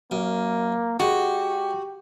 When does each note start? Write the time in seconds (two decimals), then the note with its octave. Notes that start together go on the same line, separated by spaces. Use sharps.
0.11 F#2 A#3
1.00 G#3 F#4 G4